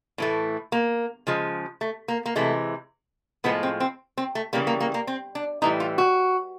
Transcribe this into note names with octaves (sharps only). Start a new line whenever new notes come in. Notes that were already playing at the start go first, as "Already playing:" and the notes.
A2 E3 A3
A#3
C#3 F3 G#3
A3
A#3
A#3
C3 E3 G#3 A3
A2 F3 G#3 B3
C4
C4
C4
A3
C#3 E3 G3 A#3
A#3
A#3
A#3
C4
D4
A2 E3 G3 D#4
F4
F#4